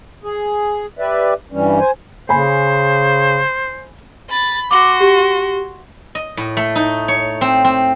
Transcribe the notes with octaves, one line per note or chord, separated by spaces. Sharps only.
G#4
G4 B4 D5 E5
G2 E3 G3 C#4
C5 G#5
C#3 C5 G#5 B5
B5 A6
F#4 C6 D6
G4
D#5
A2
A3
D#4
C#5
C4
C4